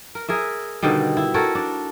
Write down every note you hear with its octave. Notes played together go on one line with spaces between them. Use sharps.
A#4
G#4 A#4 E5
B2 D3 D#3 G3
E4
F#4 A4 A#4 C#5
D4